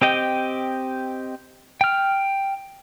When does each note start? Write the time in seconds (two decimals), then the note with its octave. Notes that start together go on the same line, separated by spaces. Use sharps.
0.02 C4 G4 D#5 G5
1.81 G5 F6